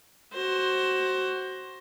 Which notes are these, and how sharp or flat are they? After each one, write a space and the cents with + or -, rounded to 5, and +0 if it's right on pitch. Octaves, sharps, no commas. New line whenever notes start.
F#4 +20 C5 +20